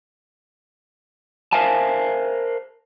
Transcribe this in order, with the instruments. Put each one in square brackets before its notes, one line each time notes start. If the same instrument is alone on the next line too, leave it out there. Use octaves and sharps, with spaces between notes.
[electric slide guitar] A#4 C5 E5 F5 G#5 A5